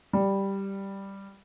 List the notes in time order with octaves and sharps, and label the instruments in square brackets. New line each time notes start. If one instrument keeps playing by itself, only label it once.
[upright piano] G3